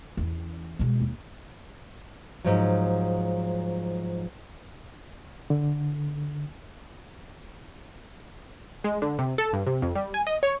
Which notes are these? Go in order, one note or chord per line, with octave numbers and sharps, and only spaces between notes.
E2 C#4
B2 G#3
D#2
G#2 F3 F#3
D3
G#3
D3
C3
A4
G2
C3
F2
G3
G#5
D#5
C#5